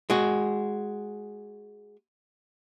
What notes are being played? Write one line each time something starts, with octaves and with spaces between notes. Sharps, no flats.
G#3 F#4